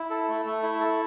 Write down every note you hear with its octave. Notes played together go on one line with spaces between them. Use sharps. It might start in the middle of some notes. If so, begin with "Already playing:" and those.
Already playing: E4
A4
A3
A3
E4
A4